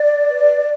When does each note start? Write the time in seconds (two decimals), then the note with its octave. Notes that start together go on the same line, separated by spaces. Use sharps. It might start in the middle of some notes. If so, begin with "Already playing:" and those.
Already playing: D5
0.29 B4